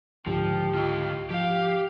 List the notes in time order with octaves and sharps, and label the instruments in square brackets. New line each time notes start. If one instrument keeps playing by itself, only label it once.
[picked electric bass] C#2 G#2 D3 [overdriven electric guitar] F3 [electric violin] G4
[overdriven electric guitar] F4 D#5
[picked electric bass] F3 [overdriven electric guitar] G4 [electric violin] F5